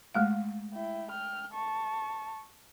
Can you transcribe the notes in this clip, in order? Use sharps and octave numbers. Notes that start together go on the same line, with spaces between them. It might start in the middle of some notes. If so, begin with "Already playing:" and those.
G#3 A3 F5
E4 G5
G5 F6
A5 C#6